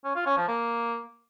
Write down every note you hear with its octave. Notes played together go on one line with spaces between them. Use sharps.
C#4
F4
C#4
F3
A#3